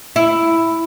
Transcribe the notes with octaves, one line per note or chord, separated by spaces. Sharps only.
E4